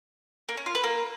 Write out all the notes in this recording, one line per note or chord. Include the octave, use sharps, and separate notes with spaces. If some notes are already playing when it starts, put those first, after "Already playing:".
A#3
C#4
F4
B4
A#3